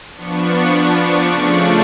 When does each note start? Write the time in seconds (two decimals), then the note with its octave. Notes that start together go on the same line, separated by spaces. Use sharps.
0.16 F3 B3 D4 C#6
0.73 C#6
1.01 D6
1.29 C#3 F3 A3 D4 C#6